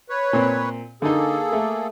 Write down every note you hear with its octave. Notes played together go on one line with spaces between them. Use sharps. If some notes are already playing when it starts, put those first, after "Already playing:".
B4 C#5
A#2 C4
D3 A#3 D#4 G#4 A4
A3